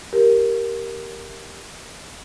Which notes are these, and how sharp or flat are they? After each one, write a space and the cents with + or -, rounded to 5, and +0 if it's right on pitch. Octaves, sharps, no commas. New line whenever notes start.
G4 +0 A#4 +5